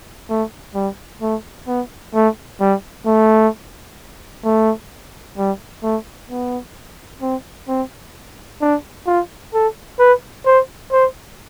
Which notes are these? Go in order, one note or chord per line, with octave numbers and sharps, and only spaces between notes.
A3
G3
A3
B3
A3
G3
A3
A3
G3
A3
B3
C4
C4
D4
F4
A4
B4
C5
C5